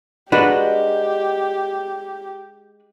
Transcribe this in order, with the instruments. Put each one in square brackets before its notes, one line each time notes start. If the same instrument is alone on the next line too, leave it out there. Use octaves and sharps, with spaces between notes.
[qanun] G#3 A#4 [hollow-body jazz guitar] D4 F#4 B4 [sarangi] G4